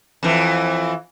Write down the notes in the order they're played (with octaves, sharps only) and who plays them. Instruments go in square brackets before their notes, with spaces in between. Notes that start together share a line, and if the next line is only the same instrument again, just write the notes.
[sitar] F2 E3